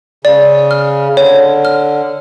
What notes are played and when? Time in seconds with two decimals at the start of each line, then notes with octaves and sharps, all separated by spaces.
0.25 C#3 D5
0.71 F6
1.17 D3 C#5
1.65 F6